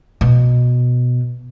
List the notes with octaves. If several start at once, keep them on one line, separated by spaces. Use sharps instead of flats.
B2